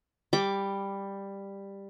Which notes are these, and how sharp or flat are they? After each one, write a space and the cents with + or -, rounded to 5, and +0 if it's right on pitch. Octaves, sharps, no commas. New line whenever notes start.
G3 +10 D6 +0